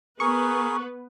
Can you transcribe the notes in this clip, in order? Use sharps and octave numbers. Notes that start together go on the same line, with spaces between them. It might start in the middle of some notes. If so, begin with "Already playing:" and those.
B3 G#4 A#4 B4 C#6